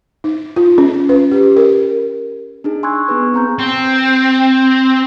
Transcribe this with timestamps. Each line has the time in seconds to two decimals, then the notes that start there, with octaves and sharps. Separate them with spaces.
0.24 D#4
0.56 F4
0.78 C#4
1.09 B4
1.31 G4
1.56 A#4
2.64 D4 D#4 G#4
2.83 G#5 C6 C#6 E6 F#6 G#6
3.07 B3 G#4 B4 C#6
3.34 C4 A#5 G6
3.59 C4